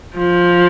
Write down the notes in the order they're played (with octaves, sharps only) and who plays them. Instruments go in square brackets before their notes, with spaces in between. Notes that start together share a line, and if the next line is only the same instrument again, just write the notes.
[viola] F3